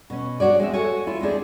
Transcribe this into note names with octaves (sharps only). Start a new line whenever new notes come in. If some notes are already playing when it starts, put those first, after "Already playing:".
B2 C#4
G#3 D4 F#4 C#5 D5
G#3 C4 E5
F#4 A4 C#5 G#5
E4 F4
G#3 C4 D4 G#4